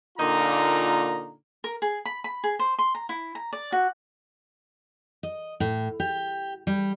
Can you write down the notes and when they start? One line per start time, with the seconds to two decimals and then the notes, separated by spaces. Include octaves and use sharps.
0.18 A#2 D3 A#3 D#4 F4 A#5
1.64 A#4
1.82 G#4
2.06 B5
2.24 B5
2.44 G#4
2.59 C5
2.79 C6
2.95 A#5
3.09 E4
3.35 A#5
3.53 D5
3.72 F#4
5.23 D#5
5.60 A2
6.00 G4
6.67 G3